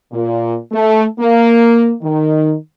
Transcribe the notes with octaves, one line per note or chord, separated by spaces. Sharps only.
A#2
A3
A#3
D#3